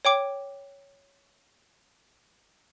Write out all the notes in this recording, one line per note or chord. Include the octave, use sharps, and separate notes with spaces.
C#5 G5 D6